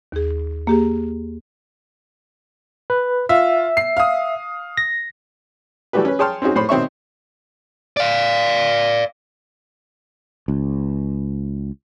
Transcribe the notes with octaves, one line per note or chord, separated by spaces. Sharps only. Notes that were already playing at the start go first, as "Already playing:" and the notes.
D#2 G#4
A#3 G4 G#4
B4
F4 E5
C7
F5 D#6
A#6
E3 G3 A3 F#4 G4 B4
C#4 B4
G#4 C#5 G5 A5 C6 F6
C4 C#4 D#4 F#4 G#4
A2 C5 C#5 B5 C6
B2 D#3 C4 C#5 E5 C#6
D5 F5
C#2